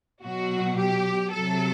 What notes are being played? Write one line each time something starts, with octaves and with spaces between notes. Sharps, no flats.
B2 F#3 F#4
G4
C3 F#3 A4